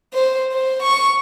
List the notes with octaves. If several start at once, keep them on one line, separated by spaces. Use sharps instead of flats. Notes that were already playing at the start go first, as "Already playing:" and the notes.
C5
C5
C#6